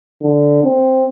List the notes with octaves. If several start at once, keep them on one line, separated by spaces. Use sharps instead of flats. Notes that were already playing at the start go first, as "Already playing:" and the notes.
D3
C4